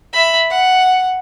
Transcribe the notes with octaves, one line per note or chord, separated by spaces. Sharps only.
E5 B5
F#5